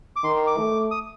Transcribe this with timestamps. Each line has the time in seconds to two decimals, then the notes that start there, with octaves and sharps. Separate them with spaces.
0.16 D6
0.24 D#3 C6
0.47 D6
0.57 A3
0.91 D#6